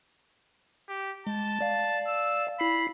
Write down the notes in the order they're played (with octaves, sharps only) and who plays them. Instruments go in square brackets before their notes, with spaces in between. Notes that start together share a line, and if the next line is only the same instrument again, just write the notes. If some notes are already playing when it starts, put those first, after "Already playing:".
[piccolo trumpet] G4
[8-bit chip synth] G#3 [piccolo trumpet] A5
[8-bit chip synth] D5 F5
[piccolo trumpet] E6
[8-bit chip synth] E4 C7 [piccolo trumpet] B5